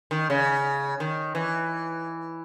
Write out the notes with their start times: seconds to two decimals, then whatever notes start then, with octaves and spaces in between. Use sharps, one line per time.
0.11 D#3
0.30 C#3
1.00 D#3
1.35 E3